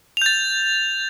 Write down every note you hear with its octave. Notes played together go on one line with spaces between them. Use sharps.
G6 A6 F7